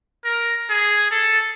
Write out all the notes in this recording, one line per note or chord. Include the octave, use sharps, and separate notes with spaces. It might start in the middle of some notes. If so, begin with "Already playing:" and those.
A#4
G#4
A4